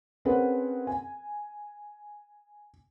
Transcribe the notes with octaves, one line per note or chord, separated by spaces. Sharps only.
C4 C#4 G#4 A#4 B4 F#5
G#5